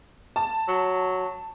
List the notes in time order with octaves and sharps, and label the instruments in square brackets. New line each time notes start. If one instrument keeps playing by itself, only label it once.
[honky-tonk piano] A5
[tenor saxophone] F#3